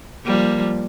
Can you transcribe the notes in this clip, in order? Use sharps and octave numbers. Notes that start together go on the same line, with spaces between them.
F3 G3 A#3